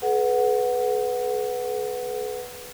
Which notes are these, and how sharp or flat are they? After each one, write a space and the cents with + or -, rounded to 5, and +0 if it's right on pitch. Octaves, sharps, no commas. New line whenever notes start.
G#4 +45 B4 +0 F#5 +0